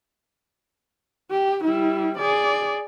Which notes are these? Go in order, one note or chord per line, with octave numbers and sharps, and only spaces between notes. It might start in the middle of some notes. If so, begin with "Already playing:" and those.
G4
G3 E4
G#4 D5